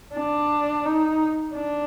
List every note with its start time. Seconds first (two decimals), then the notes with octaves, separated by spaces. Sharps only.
0.15 D4
0.85 D#4
1.55 D4